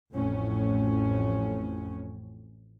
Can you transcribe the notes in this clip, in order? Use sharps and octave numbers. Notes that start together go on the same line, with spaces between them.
A1 F2 A2 C#4